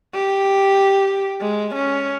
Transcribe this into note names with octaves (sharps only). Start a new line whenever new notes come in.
G4
G#3
C#4